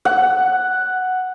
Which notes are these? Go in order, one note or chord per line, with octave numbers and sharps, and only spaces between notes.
F#5